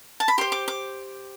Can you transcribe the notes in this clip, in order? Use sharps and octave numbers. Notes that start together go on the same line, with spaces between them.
A5
B5
G4 C5 C6
D6
D6